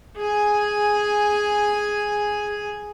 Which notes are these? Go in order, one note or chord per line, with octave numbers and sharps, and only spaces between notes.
G#4 G#5